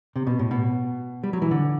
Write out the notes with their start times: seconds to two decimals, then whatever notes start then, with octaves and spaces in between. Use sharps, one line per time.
0.16 C3
0.27 B2
0.39 A2
0.51 B2
1.23 G3
1.33 F#3
1.42 E3
1.51 D3